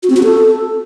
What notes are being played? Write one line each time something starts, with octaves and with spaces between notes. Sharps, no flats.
F#4
C4
F#4
A4